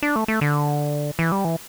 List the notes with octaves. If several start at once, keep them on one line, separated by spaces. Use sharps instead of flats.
D4
A3
A3
D3
E3
G3
E3